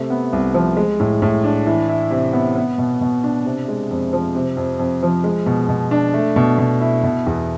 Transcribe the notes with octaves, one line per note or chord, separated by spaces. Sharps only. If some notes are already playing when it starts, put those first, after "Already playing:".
Already playing: C3 A3
B3
C2
F3
G#3
A2
A2
D4
E3
E4
C3
B3
B3
B2
B2
D4
C3
G#3
F2
F3
C3
F2
F2
F3
G#3
B2
B2
D4
A3
B2
B2
E4
B2
E2